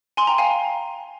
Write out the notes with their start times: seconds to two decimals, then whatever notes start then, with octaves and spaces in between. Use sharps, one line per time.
0.17 G#5 C6
0.27 G5 A#5
0.38 F5 G#5